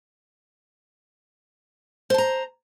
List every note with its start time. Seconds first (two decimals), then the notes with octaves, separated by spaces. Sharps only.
2.10 C5
2.14 A5
2.18 A#5